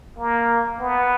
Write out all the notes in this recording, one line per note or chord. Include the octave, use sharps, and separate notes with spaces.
A#3
B3